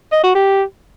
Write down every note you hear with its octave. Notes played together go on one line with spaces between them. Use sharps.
D#5
F#4
G4